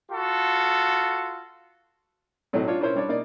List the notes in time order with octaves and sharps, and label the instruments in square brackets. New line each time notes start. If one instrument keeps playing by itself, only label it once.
[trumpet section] F4 F#4 A4
[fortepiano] A2 F#3 A3 C4 D#4
D4 F4 C#5
C#4 E4 A#4 C5 C#5
G3 D4 C#5 D5
A#3 D#4 D5